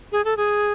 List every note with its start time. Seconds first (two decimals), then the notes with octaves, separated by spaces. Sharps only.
0.12 G#4
0.25 A4
0.37 G#4